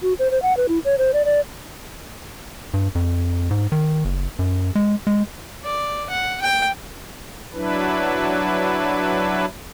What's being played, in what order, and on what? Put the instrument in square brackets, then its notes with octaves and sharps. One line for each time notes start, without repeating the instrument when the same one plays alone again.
[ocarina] F#4
C5
C5
F#5
B4
E4
C#5
C5
D5
D5
[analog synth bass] G2
F2
G#2
D#3
F#1
F#2
G#3
G#3
[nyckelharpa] D5
F#5
G5
[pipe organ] F#3 D4 E4 B4